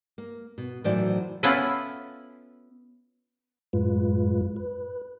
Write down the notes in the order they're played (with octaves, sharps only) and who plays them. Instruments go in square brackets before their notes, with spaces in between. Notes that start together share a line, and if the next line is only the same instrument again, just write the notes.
[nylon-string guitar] A#3
B2
A2 D#3 E3 F#3 C5 D5
[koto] B3 C#4 E4 F4 A4 B4
[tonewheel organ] F#2 A2 G#3 F4 B4
B4